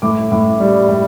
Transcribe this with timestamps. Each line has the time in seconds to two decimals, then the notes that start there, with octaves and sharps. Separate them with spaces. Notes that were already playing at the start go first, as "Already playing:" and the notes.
0.02 A2 D6
0.32 A2
0.60 G3
0.88 G3